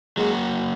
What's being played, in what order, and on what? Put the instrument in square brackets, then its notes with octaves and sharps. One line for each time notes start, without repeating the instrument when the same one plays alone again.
[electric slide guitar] F#3 A#3 F#4 [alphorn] G#3